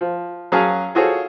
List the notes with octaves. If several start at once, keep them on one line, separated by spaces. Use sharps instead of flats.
F3
F#3 C#4 G#4 F5 A5 F6
F4 F#4 G#4 A4 C5 C#5